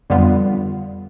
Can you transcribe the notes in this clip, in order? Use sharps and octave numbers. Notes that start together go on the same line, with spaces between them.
F2 D3 G3 B3 F4